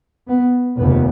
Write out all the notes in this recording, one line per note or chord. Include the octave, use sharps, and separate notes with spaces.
B3
F1 D#2 C#3 B3